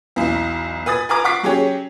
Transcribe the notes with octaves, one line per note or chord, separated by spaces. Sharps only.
B1 E2
B4 G#5 D#6 A6
B4 G#5 A#5 D6
F#5 C#6 D6 B6 C7
F#3 C#4 G4 G#4 C#5